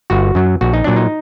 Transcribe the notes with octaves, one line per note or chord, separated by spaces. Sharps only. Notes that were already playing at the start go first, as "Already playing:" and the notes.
G1 F#4
F#2 F#3
A#1 F#4
D#4
A#2 F#3 D4
D#4